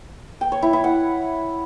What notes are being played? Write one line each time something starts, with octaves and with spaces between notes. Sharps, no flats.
G5
C#5
E4
E4
F#5